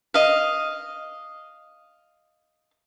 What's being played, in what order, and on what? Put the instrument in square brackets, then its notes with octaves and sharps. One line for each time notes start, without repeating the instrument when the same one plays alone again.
[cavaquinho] D#5 F5